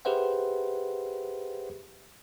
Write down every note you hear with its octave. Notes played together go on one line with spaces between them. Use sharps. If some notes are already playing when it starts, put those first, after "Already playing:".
G4 G#4 B4 C5 E5 F#5